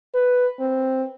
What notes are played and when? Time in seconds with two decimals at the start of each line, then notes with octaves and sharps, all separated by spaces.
0.14 B4
0.60 C4